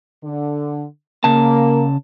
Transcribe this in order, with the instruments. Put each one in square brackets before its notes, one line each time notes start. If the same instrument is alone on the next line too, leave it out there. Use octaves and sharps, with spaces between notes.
[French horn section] D3
[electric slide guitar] C#3 A5 [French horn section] A#3